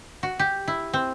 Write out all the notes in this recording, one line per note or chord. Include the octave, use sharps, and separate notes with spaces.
F#4
G4
E4
C4